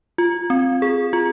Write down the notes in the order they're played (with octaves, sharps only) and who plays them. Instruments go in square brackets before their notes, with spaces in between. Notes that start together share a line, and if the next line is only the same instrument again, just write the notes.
[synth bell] F4
C4
G#4
F4